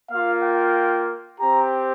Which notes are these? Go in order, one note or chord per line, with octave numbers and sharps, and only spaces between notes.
A#3 F4 F5
G5
C4 G4 A#5